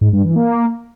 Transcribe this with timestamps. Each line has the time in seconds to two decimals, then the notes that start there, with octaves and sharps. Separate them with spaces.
0.01 G#2
0.13 G2
0.24 E3
0.36 A#3